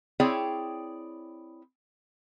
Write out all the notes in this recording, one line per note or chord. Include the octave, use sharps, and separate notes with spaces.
C4 E4 G#4 C#5 D5 G5